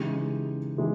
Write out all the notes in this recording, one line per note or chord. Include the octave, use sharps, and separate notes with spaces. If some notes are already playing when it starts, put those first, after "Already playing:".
Already playing: C#3 E3 G#3 D#4 G4
C#3 E3 G#3 D#4 G4